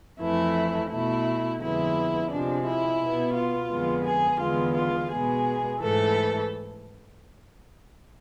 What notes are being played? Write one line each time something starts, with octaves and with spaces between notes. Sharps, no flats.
F2 E3 A3 E4
B2 A3 E4
F2 D3 G#3 B3 E4
C3 F3 G#3 D4
E4
B2 B3
F4
F2 D3 G#3 B3
G#4
E2 D3 G#3 B3 F4
F4
B2 G#3 B3 G#4
G#2 E3 A3 A4